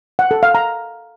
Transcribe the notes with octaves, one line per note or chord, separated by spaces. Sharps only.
F#5
A4
F5
A#5